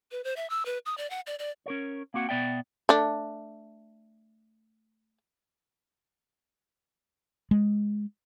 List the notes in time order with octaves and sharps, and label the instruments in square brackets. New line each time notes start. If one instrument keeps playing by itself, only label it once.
[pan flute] B4
C5
E5
E6
B4
D#6
D5
F#5
D5
D5
[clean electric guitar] C#4 A#4 C#5
A#3 C4 F#4 F#5
B2 B3 D5 E5 G5
[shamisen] A3 D4
[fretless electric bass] G#3